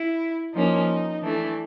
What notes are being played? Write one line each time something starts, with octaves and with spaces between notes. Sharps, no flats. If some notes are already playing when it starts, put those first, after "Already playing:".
Already playing: E4
F3 A#3 C#4 D#4
E3 A3 D4